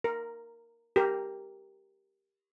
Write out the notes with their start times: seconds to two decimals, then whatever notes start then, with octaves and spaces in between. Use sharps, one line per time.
0.04 A#4
0.96 G4 A#4